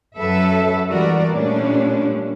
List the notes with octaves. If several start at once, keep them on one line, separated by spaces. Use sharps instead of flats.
F#2 F#3 A4 B4 E5
E3 G3 G#3 F#4 A#4 D5
A#2 G3 A3 C#4 D4